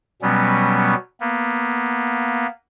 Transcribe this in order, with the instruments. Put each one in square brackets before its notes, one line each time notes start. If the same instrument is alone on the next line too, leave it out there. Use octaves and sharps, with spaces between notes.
[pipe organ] B2 F#3 G3 B3 C#4
A#3 B3